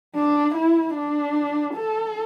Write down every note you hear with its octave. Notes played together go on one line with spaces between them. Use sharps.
D4
E4
D4
A4